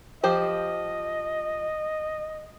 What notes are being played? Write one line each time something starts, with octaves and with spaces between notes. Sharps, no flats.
F3 G4 C5 D#5